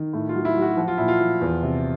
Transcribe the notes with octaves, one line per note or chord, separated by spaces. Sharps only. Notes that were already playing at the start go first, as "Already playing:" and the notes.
Already playing: D#3
A2
F4
F#3
E4
F#3
F#4
F3 F#4
F4
A#2 E4
F4
F3
E2
C3